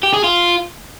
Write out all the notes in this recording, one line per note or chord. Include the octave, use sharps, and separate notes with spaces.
G4
G#4
F4